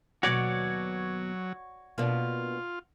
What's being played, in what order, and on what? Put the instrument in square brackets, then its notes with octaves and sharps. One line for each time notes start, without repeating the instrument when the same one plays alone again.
[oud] D#2 B2 [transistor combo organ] F#3 [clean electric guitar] F#4 C#5 D5
[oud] B2 A#3 D4 [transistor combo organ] F4